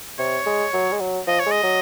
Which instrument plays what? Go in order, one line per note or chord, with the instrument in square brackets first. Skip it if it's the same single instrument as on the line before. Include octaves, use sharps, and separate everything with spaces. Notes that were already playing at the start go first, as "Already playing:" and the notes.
[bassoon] C3 [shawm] C#5
[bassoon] G#3
F#3
G#3
F#3
[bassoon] F3 [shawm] D#5
[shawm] C#5
[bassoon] G#3
[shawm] D#5
[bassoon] F#3